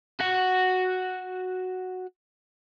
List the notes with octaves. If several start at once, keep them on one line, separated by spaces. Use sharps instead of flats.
F#4 F#5